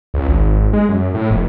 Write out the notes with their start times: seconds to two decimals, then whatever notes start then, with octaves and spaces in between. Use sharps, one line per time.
0.14 C#2
0.27 G#1
0.57 G#1
0.73 G#3
0.89 F#2
1.14 A2
1.31 F1